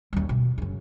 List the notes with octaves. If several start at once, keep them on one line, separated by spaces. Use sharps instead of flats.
D#2 G3
B2
F#2 C#3